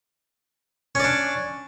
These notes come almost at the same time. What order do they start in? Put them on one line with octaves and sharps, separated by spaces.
C#4 D5 D4